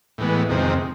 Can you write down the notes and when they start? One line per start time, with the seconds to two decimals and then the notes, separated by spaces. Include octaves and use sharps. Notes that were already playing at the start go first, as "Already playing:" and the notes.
0.18 A2 E3 G#3 B3
0.49 F2 C3 D#3 G#3 C4